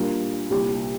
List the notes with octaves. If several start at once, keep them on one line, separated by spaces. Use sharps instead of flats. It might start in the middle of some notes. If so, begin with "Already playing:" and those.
Already playing: A#2 G3 D4 F4 A#4
C2 A#2 G3